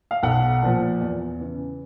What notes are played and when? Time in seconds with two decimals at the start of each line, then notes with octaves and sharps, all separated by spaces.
0.11 F5
0.23 B1 F#5
0.62 A#2 F3
1.01 E2
1.40 C#3 E3